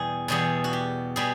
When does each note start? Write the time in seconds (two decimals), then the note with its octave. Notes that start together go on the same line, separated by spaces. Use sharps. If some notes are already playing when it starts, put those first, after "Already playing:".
Already playing: E2 B2 G3 G#4
0.28 E2 B2 G3 G#4
0.64 F#4
0.73 G4
1.16 B2 G3 G#4